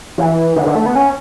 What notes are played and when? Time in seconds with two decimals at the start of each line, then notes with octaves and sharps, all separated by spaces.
0.18 E3
0.56 D3
0.66 D3
0.75 A3
0.86 B3
0.95 C#4